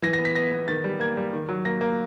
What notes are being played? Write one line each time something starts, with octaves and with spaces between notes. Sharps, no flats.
E3 A#6
A#6
B3
B6
B3 A#6
B3
D#3 A6
G3
A#3 G#6
G3
D#3
F#3
A#3 A#6
A#3